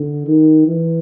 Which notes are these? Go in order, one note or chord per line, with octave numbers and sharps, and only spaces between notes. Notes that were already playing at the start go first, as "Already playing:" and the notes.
Already playing: D3
D#3
E3